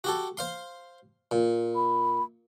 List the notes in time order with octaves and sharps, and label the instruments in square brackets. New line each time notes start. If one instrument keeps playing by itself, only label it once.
[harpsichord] F#4 G4 A4
C5 F5 C6
A#2
[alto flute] B5